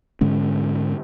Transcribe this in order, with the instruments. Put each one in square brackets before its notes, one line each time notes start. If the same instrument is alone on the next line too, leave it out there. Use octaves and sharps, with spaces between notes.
[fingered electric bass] G#2 D3 G#3 C#4